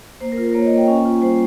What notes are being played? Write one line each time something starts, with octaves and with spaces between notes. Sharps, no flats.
A#3 C5
A#4
F4
A#4
A#3 C#5
D#5
A#3
G5
C#4 G#5
F4
G3 C5